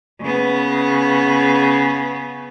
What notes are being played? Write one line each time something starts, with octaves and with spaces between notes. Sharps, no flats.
C#3 B3